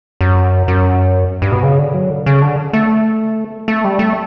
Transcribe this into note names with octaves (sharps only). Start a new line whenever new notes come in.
F#2
F#2
G2
B2
C#3
D3
F#3
D3
C#3
D3
A3
A3
G3
A3